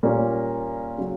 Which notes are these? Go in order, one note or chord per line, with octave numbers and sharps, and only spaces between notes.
A#2 G3 A#3 C#4 F4
C#3 F#3